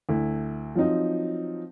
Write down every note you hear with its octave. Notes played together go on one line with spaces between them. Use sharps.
D2 E4
F3 F#3 C4 D#4